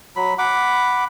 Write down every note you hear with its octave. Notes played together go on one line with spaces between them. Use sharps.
F#3 B5
F#5 B5 D6